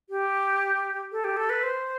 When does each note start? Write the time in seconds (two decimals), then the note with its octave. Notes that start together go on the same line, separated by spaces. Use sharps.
0.10 G4
1.12 A4
1.24 G4
1.37 A4
1.50 B4
1.63 C5